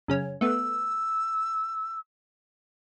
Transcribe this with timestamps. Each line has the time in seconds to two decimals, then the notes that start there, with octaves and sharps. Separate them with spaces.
0.08 F#2 C#3 C#4
0.41 A3 B3 E6